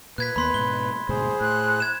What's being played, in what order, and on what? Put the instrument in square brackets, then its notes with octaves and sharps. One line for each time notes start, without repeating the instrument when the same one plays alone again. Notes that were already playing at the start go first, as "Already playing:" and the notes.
[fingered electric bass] A#2 [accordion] B4 [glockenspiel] F#6 G#6 B6
[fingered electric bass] D#2 A#3 B3 [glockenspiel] B5 C6 B6
[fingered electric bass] G#2 B2 [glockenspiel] G7
[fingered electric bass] D2 G#2 B2 [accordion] G#4 C5
[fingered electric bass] A2 [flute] F#6
[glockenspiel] G#6 E7